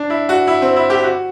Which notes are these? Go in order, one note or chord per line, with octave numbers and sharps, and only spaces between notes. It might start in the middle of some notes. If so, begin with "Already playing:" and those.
Already playing: D4
E4
F#4
E4
C4
E4
G4
F#4